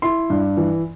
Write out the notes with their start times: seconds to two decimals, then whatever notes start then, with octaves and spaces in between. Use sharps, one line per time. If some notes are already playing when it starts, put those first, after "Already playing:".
0.02 E4 C6
0.30 G2
0.57 E3